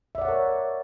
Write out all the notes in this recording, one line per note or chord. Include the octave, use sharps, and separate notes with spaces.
A#4 C#5 D5 E5 F#5